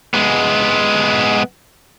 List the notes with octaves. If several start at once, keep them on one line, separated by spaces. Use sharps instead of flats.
G#3 B3